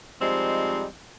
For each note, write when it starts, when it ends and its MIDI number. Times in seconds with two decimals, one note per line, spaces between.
0.21 0.85 53
0.21 0.85 55
0.21 0.85 56
0.21 0.85 60
0.21 0.85 63